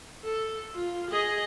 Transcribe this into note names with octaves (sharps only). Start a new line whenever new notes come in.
A4
F4
G#4 D#5